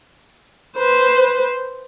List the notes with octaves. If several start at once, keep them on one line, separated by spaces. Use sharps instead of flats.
B4 C5